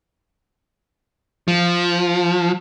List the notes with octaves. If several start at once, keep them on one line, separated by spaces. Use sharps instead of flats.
F3